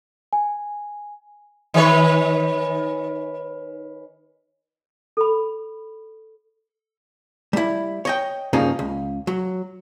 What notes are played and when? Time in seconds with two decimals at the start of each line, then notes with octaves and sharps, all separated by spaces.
0.33 G#5
1.74 D#3 B4 C#5
5.17 A4 B5
7.53 G3 E4
8.05 C#5 D#5 G5
8.53 G2 C#3 F3 A#3 D#4
8.79 C#2
9.27 F#3